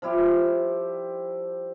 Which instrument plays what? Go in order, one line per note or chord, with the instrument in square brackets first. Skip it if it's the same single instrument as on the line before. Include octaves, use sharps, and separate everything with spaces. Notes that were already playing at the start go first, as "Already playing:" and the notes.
[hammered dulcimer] F3 G3 E4 G4